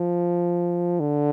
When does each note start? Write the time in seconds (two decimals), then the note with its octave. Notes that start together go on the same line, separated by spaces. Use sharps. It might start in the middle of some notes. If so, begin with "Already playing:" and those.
Already playing: F3
1.00 D3